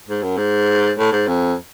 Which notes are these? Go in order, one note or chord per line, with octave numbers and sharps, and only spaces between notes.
G#2
F#2
G#2
A2
G#2
F2